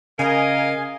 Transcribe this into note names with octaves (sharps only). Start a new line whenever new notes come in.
C#3 A#4 D#5 F5 G#5